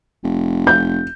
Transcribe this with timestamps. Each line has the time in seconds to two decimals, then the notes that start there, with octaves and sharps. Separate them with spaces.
0.24 F1
0.67 G6